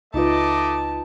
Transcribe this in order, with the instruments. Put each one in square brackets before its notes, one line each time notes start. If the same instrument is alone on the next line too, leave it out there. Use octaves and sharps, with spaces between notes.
[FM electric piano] C#2 F4 [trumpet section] A3 D#5 D6 [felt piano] D#4 B4 [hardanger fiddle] A5